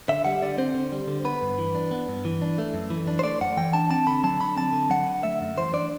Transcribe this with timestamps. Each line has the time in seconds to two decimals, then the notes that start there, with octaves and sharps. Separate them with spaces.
0.09 D3 E5
0.25 G3 F#5
0.42 D3 D5
0.58 C4 C5
0.74 D3
0.92 G3
1.08 D3
1.25 B3 B4
1.42 G2
1.58 E3
1.75 D4
1.91 B3
2.08 G2
2.25 E3
2.42 D4
2.58 A3
2.74 F#2
2.90 E3
3.07 D4
3.19 C5
3.24 A3 D5
3.41 F#2 F#5
3.57 E3 G5
3.73 D4 A5
3.90 C4 A5
4.07 D3 B5
4.24 F#3 A5
4.40 D3 B5
4.56 C4 A5
4.73 D3
4.90 F#3 F#5
5.07 D3
5.23 A3 E5
5.41 F#2
5.57 E3 C5
5.73 D4 D5